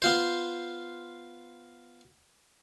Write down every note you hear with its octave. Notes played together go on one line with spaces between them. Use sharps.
B3 F4 C5